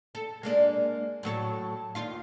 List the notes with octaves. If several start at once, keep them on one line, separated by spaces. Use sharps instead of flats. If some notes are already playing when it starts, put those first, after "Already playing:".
A4
G#3 A#3 D4
A2 F#3 A4
D#2 F4 F5